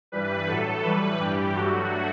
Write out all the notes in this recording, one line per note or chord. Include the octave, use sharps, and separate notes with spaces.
G2 E3 G3 B4
A2 F#3 A3 A4
A2 E3 G3 B4
G2 E3 G3 G4
G2 F#3 A3 F#4